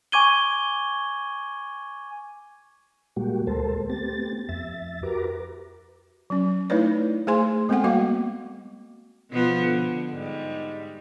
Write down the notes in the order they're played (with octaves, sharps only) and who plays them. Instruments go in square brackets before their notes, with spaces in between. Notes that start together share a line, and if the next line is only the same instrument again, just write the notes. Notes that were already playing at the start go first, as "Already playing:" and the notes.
[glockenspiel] G#5 C#6 D6 G#6 D#7 G7
[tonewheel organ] A#2 G3 G#3 A#3 F#4 G4
D2 G#3 A4 A#4 C5 A5
A3 B3 C4 G4 A6
F2 E5 A6
F#4 G4 A#4 B4 A#5 D6
[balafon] F#3 C#4
A3 D#4 E4 B4 C#5 D5
A3 G#4 C5 G#5 C6
G#3 B3 C4 A4 F#5 G5
G3 A#3 F#4 F5 D6
[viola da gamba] B2 F3 B3
D3
G#2 G3